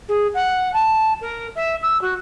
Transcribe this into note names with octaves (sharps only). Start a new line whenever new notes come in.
G#4
F#5
A5
A#4
E5
E6
F#4